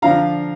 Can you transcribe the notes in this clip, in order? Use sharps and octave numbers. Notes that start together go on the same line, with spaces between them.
D3 F3 D4 F5 A#5